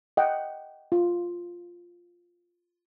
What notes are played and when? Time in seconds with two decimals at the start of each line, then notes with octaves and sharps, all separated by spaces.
0.17 D#5 F#5 G5
0.92 F4